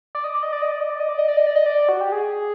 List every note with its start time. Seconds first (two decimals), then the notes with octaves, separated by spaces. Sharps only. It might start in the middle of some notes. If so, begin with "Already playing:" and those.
0.15 D5
0.24 D#5
0.34 D5
0.43 D#5
0.52 D5
0.62 D#5
0.72 D5
0.81 D#5
0.90 D5
1.00 D#5
1.09 D5
1.18 D#5
1.28 D5
1.37 D#5
1.47 D5
1.56 D#5
1.66 D5
1.89 F#4
2.01 G4
2.12 G#4